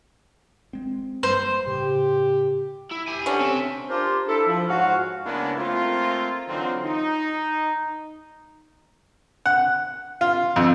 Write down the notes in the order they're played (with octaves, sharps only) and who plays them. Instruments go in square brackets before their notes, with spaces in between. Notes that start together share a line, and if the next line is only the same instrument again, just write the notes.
[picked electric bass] G#3 C4
[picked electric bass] G2 G3 A#3 [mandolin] C5
[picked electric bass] A2 C#3 [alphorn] G4
[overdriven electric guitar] E4
G4 G#5
[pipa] D3 C#4
[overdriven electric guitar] C4 E5
[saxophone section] D4 F4 G4 A#4 C5
D4 E4 A4
F3
G#2 F#4 C#5 F5
[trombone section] C#3 G#3 A#3 B3 D4 E4
A3 A#3 C4 F4
D3 E3 F#3 C4 D#4 F4
D#4
[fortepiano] F#5
F4
F2